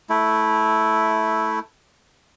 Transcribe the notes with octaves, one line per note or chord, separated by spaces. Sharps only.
A3 E4